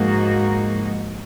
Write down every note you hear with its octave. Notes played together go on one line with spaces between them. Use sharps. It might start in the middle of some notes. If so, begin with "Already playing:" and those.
Already playing: G#2 F3 A#3 D#4 F#4